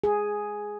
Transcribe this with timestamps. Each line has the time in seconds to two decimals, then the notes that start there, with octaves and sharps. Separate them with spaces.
0.04 G#4